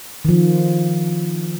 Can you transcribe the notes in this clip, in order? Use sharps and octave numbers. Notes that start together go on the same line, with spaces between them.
D#3 F3